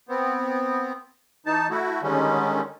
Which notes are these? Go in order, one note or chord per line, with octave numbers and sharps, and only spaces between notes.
B3 C4
E3 D#4 A5
A3 E4 F#4
D3 D#3 G3 G#3 C#4